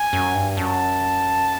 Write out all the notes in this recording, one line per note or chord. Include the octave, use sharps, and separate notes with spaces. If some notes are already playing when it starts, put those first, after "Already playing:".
Already playing: G#5
F#2
G2
F#2 A5